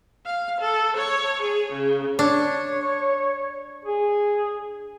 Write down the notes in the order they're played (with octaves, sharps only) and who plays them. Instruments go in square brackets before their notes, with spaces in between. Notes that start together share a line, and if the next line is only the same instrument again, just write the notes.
[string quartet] F5
A4
C#5
G#4
C#3
[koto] D4 [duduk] C#5
[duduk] G#4